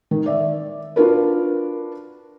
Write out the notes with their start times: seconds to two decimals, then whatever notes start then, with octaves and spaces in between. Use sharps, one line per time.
0.11 D#3
0.26 D5 E5
0.96 D4 F4 F#4 A#4 B4